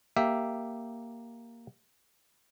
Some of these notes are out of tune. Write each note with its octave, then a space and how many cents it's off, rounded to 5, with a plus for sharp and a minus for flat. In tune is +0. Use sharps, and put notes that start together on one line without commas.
A#3 +0 G4 +0 E5 +0